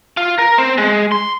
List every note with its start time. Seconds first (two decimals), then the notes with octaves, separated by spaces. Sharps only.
0.17 F4
0.38 A#4
0.58 C4
0.78 G#3
1.12 C6